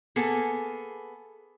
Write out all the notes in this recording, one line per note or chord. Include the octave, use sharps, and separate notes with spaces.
A#3 B3 G#4 A4